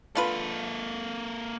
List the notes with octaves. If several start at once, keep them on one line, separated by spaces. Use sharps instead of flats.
D3 A#3 F4 A4 B4